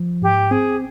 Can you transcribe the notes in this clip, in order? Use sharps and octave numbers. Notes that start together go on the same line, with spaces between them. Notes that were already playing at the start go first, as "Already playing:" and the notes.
Already playing: F3
G#2 G4
C4 G#4